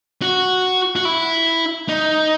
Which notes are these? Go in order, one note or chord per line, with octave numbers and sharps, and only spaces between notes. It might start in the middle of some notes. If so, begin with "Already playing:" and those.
F#4
F#4
E4
D#4